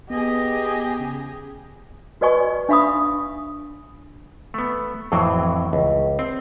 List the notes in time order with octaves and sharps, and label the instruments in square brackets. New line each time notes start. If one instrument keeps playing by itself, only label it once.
[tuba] B3 [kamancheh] G4 G#4 [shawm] D#5
[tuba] C#3
[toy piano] F#4 B4 D5 D#5 G#5 C#6
D4 E5 F5 B5 C#6 D#6
[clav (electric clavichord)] A3 B3
F2 A2 E3 F#3 C4
C#2
C4